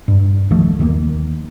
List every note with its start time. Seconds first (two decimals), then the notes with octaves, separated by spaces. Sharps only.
0.08 G2
0.50 C2 D#3 F3 A3
0.79 D#2 D#3 F#3 A#3